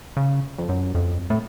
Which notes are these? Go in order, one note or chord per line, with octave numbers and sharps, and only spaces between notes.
C#3
F2
F#2
F2
A2